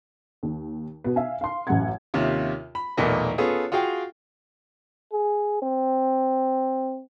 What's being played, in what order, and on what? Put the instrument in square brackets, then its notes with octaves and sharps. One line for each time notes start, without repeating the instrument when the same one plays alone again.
[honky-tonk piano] D#2
B2 B3
E5 F5 G#5
F5 C6
A1 F#2 F#5 G#6
[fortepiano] D#2 C3 C#4 F4 E5
B5
B1 E2 A#2 A3 A#3 D#5
B3 C#4 F4 G#4 A4 C#5
F4 F#4 G#4 F5 G5
[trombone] G#4
C4